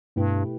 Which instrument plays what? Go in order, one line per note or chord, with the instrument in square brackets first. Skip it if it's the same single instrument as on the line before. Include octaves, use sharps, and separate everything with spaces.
[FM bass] G2 [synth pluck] B2 A3 E4 G4 B4